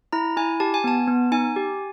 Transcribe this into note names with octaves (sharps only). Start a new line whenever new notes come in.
E4 A#5
E4 G#5
G4 A5
G#5
B3 A5
B3
D#4 G#5
G4